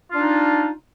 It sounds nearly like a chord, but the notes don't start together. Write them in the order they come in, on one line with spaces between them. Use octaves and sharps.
F4 D4 D#4